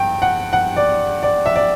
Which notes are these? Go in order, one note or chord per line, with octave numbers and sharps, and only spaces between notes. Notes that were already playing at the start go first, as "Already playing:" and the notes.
Already playing: G2 G5
F#5
F#5
D5
D5
E5
D5